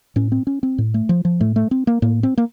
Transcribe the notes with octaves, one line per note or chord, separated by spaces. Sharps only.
A2 C#4
C4
C#4
C4
A2
A3
F3
F3
A2 A3
A3
C4
A#3
A2 A#3
C4
A#3